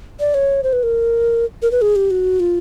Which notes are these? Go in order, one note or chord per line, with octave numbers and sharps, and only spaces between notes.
D5
C#5
C5
B4
A#4
A#4
B4
G#4
G4
F#4
F4